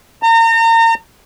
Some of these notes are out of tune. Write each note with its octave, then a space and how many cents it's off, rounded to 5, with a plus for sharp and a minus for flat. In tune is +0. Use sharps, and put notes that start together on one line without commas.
A#5 -35